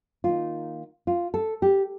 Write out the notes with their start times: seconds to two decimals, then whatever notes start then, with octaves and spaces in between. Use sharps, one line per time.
0.24 D#3 A#3 D#4 F4
1.07 F4
1.34 A4
1.62 G4